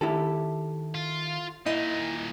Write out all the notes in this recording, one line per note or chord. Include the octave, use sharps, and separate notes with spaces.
D#3 E4 G4 A4
F4
A#2 D#4 E4 D#5